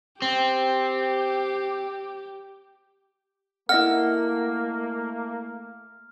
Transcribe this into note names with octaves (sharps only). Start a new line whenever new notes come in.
C4 G4
A3 A#3 E4 D#5 F#5 F6